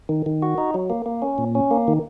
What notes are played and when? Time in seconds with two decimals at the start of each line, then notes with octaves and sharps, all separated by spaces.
0.09 D#3
0.26 D#3
0.42 F#4
0.58 D#4
0.74 F#3
0.90 A#3
1.06 A#3
1.22 C#4
1.38 A#2
1.55 C#4
1.71 A#3
1.88 D#3